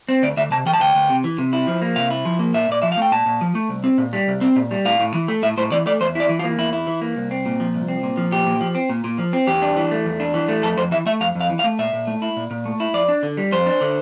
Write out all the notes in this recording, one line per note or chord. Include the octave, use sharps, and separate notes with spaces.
C4
D2 D5
D2 E5
C3 A5
E3 G5
A5
D2 G5
D2
C3
E3
C3
E4
F3
A#3
C3 F5
E4
F3
A#3
A#2 E5
A#2 D5
F3 E5
F5
A3 G5
A#2 A5
A#2
F3
A3
C2
C4
A#2
G3
C2
C4
A#2
G3
A2 F5
A2
E3
A3
A2 E5
A2 C5
E3 D5
A3 D5
E2 C5
E4 D5
E3
F4
A#3
E2 E4
E4
E3
A#3
C2
C4
A#2
F3
C2
C4
A#2
F3
A#2 G4
A#2
F3
C4
A#2
A#2
F3
C4
E2 G4
D4
E3
A3
E2
D4
E3
A3
F2 A4
F2 C5
E3 E5
A3 E5
F2 F5
F2
F5
E3
F5
A3
A#2 E5
A#2
A3
E4
A#2
A#2
A3
E4
F2 D5
D4
D3
G3
F2 C5
D4
D3